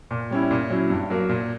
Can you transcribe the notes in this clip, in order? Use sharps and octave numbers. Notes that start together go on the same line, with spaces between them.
A#2
G3 C#4 E4
A#2
F#3 C#4 E4
G2
F#3 A#3
A#2